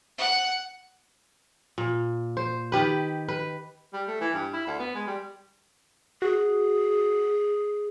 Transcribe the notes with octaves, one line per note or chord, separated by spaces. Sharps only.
F#5
A#2
C5
D#3 G4 B4
B4
G3
A3
E3
G2
E4
D2
B3
G#3
G3
F#4 G#4